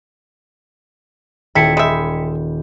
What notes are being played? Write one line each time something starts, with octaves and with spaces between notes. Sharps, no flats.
D#1 E4 G5 A5 B6 C#7 E7
G#3 E5 B5 G6 G#6